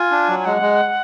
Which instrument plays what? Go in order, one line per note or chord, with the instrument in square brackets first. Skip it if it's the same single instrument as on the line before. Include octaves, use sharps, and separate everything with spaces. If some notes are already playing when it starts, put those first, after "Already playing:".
Already playing: [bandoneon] F4 [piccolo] G#5
[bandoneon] D4
F#3
[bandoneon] G#3 [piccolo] F#5
[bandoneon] G#3